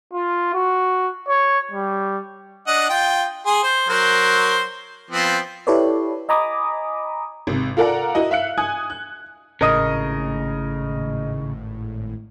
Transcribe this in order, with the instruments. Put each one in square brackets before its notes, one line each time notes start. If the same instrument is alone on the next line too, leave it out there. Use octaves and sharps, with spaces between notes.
[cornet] F4
F#4
C#5
G3
[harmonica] D4 D#5 F#5
F4 G5
G#4 C6
C5
F#3 A#4 C5
F3 B3 C4
[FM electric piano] E4 G4 A4 B4 C#5 D5
D#5 G#5 A#5 B5 D6 D#6
[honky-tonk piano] G#1 C3
F4 A4 A#4 D5 F#5 A#5
E4 F#4 D#5
E5 F5 F#6 C#7
G#5 D#6 F#6 G#6
F#6
[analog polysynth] G#1 A2 [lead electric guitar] C#3 [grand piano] A#4 D#5 D#6